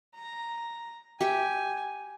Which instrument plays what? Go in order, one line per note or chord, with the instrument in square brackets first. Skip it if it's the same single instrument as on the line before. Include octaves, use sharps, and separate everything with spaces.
[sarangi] A#5
[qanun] G4 E5 [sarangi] G#5